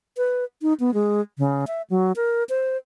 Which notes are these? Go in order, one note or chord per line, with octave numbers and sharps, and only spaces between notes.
B4
D#4
B3
G#3
C#3
E5
F#3
A#4
C5